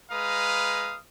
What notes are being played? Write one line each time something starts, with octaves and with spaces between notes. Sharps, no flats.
G#3 B4 F5 A#5 D#6